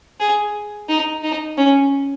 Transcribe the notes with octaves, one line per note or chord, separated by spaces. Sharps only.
G#4
D#4
D#4
C#4